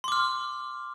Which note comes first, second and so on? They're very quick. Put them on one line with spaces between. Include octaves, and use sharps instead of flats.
C6 D6 F6